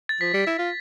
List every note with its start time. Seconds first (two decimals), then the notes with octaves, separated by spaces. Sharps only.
0.09 A6
0.21 F3 B6
0.33 G3
0.47 E4
0.59 F4